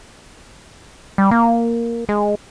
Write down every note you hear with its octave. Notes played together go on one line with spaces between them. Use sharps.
G3
A#3
G#3